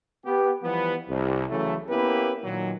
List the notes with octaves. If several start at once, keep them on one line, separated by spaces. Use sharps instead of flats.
B3 G4
E3 F3 G3 B3
C2
C#3 E3 F#3 A3
A#3 B3 C#4 E4 G4 B4
A#2 D#3 F#3